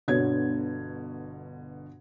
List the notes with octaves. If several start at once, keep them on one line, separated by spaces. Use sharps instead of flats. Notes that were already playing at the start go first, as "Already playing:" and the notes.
G1 B2 D3 C#5 G#6